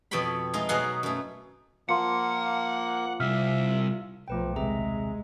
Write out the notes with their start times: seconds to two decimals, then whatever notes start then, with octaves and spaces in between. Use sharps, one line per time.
0.11 F2 B2 C#5 G5 B5
0.54 G#3 A3 D#4 F4
0.69 B2 F#3 G#4 F5 F#5 G#5
1.03 F#2 A3
1.89 F3 A#3 F#5 C6 C#7
3.20 C3 G3 E5 F6
4.28 B1 F3 A3 B4 G5
4.56 D#1 C3 G#3 G#4 E5 A#5